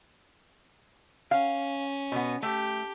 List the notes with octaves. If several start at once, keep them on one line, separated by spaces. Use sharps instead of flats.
C#4 F5
B2 B3
A3 G4